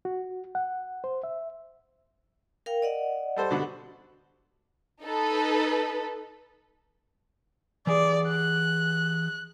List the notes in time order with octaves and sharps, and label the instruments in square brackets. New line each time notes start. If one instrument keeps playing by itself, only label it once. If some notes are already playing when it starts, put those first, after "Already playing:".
[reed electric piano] F#4
F#5
C5
E5
[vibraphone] A#4 F5 G5
D5 D#5 F#5
[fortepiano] G3 A4 C5
[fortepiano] B2 D3 [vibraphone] G4
[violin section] D#4 A4 B4
[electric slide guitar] E3 G4 G#4 [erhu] D5
[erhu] F#6